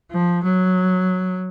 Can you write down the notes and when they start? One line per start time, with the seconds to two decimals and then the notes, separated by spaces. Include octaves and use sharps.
0.11 F3
0.43 F#3